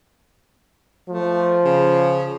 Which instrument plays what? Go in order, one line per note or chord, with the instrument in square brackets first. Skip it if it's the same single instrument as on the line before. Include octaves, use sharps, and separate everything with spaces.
[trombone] F3 [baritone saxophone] A3
[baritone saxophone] C#3